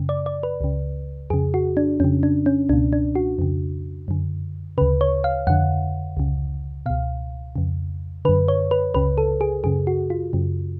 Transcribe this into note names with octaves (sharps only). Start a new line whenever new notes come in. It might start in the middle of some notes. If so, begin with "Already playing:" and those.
Already playing: F#2 C#3
D5
D5
B4
C#2 C#3
F2 C#3 G#4
F#4
D4
F2 C#3 C#4
D4
C#4
C#2 B2 D4
D4
F#4
F2 C#3
F#2 D3
D2 C#3 B4
C#5
F5
F2 D3 F#5
C#2 C#3
C#2 B2 F5
F2 C#3
F#2 D3 B4
C#5
B4
C#2 C#3 B4
A4
G#4
F#2 C#3 G#4
F#4
F4
F#2 C#3